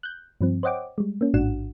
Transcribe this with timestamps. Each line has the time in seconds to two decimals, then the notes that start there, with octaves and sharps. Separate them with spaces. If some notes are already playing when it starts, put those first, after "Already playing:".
0.03 F#6 G6
0.41 G2 F3 C4
0.63 C5 C#5 D#5 F#5 G5 D6
0.98 G3 G#3
1.21 A#3 C#4
1.34 A1 G#2 D4 F#4 F#5 E7